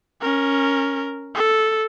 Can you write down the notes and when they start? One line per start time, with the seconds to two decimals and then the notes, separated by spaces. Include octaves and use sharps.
0.21 C#4 A#4
1.35 A4